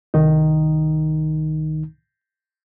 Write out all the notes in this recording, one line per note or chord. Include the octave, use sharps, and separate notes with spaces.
C2 D#3 D#4